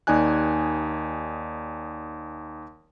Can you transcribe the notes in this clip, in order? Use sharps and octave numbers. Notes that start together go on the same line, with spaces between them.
D#2 D#4 D5 G#5 F#6